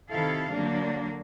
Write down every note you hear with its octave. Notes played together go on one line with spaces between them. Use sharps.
C3 D#3 E4 A4 F5
D3 F#3 A#3 D4